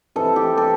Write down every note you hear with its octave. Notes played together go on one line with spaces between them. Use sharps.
C3 E3 A4
G4
A4